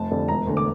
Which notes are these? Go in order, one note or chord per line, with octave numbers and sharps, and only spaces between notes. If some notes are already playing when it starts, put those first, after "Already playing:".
Already playing: F1 A5
F2 D3 G3
E1 A#5
D2 D3
D6